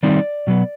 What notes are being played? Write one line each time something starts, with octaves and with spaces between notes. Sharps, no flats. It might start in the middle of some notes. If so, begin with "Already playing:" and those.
D#3 G3 C4 D#4 D5
B2 F#3 B3